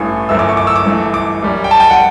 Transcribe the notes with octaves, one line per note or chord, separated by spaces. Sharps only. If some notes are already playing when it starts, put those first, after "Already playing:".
Already playing: A1 G2 E3 A3 C#6
G1 F#2 E3 A3 E6
D6
C#6
D6
E6
D6
G1 G2 E3 A3
D6
F#2 E3 G3
G5
A5
G5
F#5